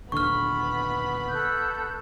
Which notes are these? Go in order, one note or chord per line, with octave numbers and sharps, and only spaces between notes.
D#1 D3 B3 B5 C#6 F6
A4 F#6 G6